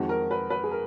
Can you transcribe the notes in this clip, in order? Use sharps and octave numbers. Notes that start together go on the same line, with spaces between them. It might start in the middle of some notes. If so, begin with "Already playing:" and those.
Already playing: F2 D#3 G#3 F#4
A#4
B4
B4
G#4
A#4